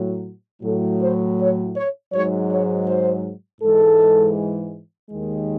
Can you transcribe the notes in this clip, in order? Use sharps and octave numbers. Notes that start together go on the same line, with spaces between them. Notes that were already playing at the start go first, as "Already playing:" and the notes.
Already playing: A2 F#3
A2 F#3 A4
C5
C#5
C#5
G#2 F#3 C#5
C#5
C5
G#2 E3 G#3 A4
D#2 D#3 G#3